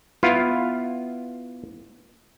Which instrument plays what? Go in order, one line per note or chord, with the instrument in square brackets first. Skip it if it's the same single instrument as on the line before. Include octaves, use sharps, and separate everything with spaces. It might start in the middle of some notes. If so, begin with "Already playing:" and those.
[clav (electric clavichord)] B3 E4 F4 F5